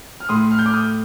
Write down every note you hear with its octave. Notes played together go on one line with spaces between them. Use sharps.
F6
A2 A3 C6 D#6
F6
G6
D6 F6
D#6 G6